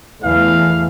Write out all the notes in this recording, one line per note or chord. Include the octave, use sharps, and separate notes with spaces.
E2 E3 A3 F5